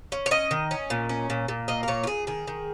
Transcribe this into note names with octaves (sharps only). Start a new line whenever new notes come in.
C#4
C#5
C#4 D#5
D#3
C#4
A#2
C#4
A#2
A#2
A#3 D#5
A#4
A#2 C#5
F4
A#2 G#4
D#3 G#4
D#3